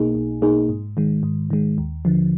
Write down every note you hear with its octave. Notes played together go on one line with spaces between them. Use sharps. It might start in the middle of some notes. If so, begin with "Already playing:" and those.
Already playing: B1 B2 A#3 D#4 G#4
B1
B2 A#3 D#4 G#4
G#2
D#3 G#3
G#2
D#3 G#3
D#2
D3 F3